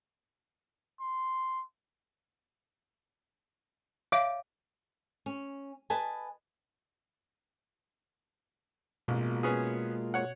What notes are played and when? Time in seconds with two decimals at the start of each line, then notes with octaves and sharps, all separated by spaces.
1.00 C6
4.12 C#5 E5 F5 D6
5.26 C#4
5.90 B4 D#5 G#5 A5
9.08 A1 B2 G#3 A#3 F4
9.43 B3 C#4 G#4
10.14 C#5 F#5